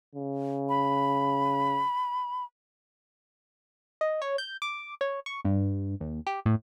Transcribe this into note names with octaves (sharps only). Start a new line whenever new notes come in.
C#3
B5
D#5
C#5
G6
D6
C#5
C#6
G2
D#2
G4
A2